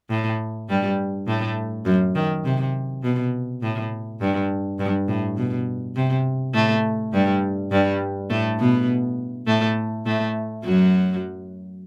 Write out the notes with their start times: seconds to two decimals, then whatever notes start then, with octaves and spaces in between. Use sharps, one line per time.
0.10 A2
0.69 G2 G3
1.27 A2 A3
1.86 F#2 F#3
2.15 D#3
2.45 C3
3.03 B2
3.62 A2
4.20 G2
4.79 G2
5.08 A2
5.37 B2
5.96 C3
6.54 A2 A3
7.13 G2 G3
7.72 G2 G3
8.30 A2 A3
8.59 B2 B3
9.47 A2 A3
10.06 A2 A3
10.64 F#2 F#3